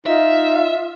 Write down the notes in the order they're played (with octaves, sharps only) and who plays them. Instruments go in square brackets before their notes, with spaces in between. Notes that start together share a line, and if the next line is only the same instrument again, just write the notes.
[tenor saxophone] D#4 [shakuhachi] F4 [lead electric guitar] E5